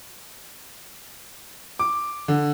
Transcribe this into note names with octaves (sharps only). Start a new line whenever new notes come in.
D6
D3